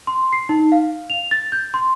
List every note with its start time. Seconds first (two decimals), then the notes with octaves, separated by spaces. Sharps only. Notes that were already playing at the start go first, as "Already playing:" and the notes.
0.07 C6
0.33 C7
0.49 D#4
0.72 F5
1.10 F7
1.31 A6
1.52 G6
1.74 C6